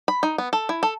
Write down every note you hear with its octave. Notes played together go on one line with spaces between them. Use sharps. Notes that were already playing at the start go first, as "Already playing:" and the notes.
B5
D#4
B3
A4
E4
A4